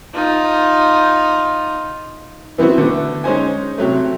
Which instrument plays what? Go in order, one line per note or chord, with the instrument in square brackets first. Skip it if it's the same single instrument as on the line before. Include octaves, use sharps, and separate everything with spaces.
[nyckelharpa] D#4 F4
[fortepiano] E3 B3 C4 E4 F#4
D3 A3 B3
G#3 C#4 D#4 C5 G#5
C3 F#3 A3